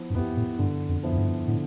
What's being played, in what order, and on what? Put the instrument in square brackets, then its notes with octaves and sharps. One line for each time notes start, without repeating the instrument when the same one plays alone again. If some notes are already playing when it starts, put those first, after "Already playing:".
Already playing: [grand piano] F3 B3 E4
[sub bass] G2
[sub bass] F2 [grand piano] B3 E4 G4
[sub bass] A2
[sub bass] G2 [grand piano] D3
[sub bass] F2
[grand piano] F3 B3 E4
[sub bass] F2
G2
[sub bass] A2 [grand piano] D3